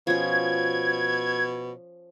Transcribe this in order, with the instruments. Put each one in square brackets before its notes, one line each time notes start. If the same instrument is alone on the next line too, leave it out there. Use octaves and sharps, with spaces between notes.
[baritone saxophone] B2 [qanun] F3 C#4 [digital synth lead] G#6